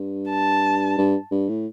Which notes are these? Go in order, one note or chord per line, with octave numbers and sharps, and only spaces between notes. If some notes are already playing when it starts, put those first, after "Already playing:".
Already playing: G2
A5
G2
G2
A2